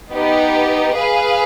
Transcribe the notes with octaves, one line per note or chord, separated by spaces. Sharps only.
B3 D#4 G4
G#4 B4 F5